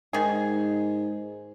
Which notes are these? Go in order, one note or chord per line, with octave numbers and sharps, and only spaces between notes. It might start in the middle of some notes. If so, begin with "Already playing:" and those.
G#2 D#3 G#4